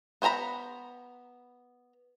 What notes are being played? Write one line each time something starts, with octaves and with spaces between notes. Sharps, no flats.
B3 C5 G#5 A#5 B5